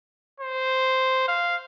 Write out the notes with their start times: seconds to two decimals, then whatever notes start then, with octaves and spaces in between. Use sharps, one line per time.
0.40 C5
1.28 F5